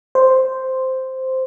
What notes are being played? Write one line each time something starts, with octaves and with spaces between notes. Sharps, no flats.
C5